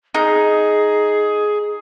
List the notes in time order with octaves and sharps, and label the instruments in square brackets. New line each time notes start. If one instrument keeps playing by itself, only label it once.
[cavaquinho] D#4 [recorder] G#4